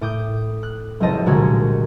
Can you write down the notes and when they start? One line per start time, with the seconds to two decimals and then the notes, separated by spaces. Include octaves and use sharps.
0.01 A2 D6 D#6 G6
0.63 F#6
1.00 F#1 C#2 F3 C4 D#5 A5
1.26 C2 A#2 D3 G#3 F#4 G#6